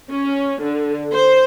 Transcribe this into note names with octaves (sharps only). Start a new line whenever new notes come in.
C#4
D3
C5